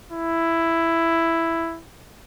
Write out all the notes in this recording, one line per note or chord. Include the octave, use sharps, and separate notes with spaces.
E4